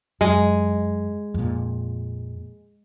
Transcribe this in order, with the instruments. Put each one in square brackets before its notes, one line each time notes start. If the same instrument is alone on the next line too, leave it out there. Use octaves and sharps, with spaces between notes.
[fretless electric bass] F#2 [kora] G#3
[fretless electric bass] F2 A#2